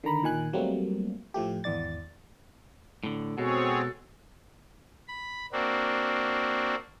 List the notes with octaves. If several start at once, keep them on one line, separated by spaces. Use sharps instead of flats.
D3 D#3 A#5 B5
A#2 D#3 G#5 F#6
F#3 G3 A3 A#3 C4
A2 F3 A3 G4
G#1 E2 E3 D5 A6
A2 D3
B2 G#3 C4 F#4 G#4 A4 C#5
B5
A#3 C4 D4 F#4